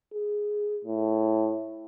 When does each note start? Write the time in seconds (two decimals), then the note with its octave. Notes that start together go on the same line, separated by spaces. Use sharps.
0.14 G#4
0.84 A2